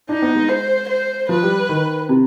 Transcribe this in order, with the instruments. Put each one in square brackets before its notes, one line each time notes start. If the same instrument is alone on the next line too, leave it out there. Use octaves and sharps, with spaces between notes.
[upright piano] D4 [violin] D#4
[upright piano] B3
G#3
[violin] C5
C5
[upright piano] F3 [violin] B4
[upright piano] G3
D#3
C3